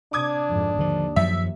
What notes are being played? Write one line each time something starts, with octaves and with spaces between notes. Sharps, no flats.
C3 D4 D6 D#6 G#6
F2 G#2
D#2 D3 F3
F#2 F3 F#3 E5